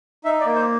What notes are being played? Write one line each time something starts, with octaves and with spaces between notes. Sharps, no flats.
D#4 E5
D5
A#3
C5